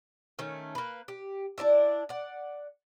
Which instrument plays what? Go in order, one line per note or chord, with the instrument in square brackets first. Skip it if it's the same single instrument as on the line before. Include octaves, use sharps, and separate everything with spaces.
[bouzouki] D#3 A3 C#4
A#3 B4
G4
D4 E4 D5 E5
D5 F#5